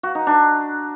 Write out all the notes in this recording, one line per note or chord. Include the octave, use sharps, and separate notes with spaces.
F#4
D#4
D4